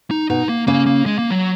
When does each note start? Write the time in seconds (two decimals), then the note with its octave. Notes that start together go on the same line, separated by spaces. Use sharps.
0.11 D#4
0.30 B2 B3 D#4
0.49 A#3
0.67 C#3 A#3 C#4
0.86 A#3
1.06 G#3
1.19 A#3
1.30 F#3